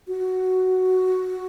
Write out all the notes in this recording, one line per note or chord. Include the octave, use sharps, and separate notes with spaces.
F#4